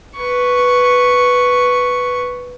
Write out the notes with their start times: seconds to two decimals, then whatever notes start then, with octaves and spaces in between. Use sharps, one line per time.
0.16 B4 C#6